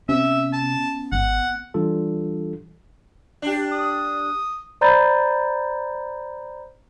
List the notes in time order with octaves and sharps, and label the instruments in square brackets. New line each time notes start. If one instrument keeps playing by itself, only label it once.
[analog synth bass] C3 [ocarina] B3 [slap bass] C#4 [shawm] E5
[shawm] A5
[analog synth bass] G#1 [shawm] F#5
[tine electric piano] E3 G3 D4 F4 A4
[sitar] D4 G4
[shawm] D#6
[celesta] C5 D5 A#5 B5 G6 A6